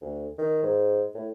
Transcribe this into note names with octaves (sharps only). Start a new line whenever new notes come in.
D2
D#3
G#2
A2